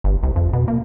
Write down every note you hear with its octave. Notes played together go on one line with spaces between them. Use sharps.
G1
C2
F2
B2
A#3